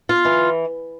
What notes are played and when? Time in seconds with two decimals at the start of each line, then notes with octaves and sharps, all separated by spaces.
0.09 F4
0.25 E3